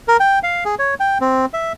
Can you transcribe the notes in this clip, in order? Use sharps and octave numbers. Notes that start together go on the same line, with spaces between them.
A#4
G5
F5
G#4
C#5
G5
C4
E5